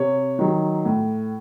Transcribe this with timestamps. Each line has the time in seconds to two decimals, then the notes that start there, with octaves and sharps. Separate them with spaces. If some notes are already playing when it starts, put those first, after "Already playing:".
Already playing: C3 C#5
0.39 D#3 F#3
0.85 A2